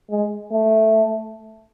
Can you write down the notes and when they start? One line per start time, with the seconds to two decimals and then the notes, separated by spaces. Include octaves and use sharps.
0.10 G#3
0.52 A3